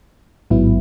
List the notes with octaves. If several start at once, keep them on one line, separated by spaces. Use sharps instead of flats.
A1 G#2 F#3 B3 E4